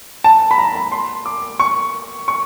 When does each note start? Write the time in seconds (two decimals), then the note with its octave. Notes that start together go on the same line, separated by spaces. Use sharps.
0.24 A5
0.51 B5
0.58 A#5
0.75 B5
0.92 C6
1.26 D6
1.60 C#6
2.28 C#6